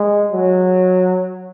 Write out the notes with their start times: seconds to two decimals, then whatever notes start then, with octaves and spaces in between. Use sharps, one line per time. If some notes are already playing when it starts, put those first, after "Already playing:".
Already playing: G#3
0.32 F#3